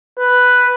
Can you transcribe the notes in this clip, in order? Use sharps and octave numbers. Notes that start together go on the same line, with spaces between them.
B4